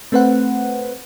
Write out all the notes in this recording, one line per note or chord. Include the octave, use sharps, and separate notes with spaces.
A3 C4 B4 C5 F#5